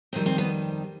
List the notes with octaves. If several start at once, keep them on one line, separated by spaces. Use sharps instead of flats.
F2 D#3 G3 C4
C4
B3